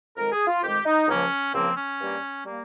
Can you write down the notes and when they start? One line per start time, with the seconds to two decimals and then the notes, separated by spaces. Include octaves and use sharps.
0.16 F2 D#3 G#3 A#4
0.32 G#4
0.48 F4
0.63 F2 D#3 G#3 G4
0.85 D#4
1.08 C#2 C#3 F3 A#3 C#4
1.54 C#2 C#3 F3 A#3 C4
1.77 C#4
2.00 G2 G3 A#3
2.46 G3 A#3